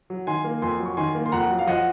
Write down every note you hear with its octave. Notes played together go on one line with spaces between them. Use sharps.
F#3
D#3 G#5 C6
A#3
F2 G#5 C6
F#3
C#6
D#3 G#5 C6
A#3
C6
F2 F#5 A#5
F#3
F5
F3 D#5 F#5